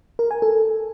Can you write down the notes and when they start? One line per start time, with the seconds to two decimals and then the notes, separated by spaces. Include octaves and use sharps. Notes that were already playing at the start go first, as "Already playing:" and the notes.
0.19 A#4
0.31 G#5
0.42 A4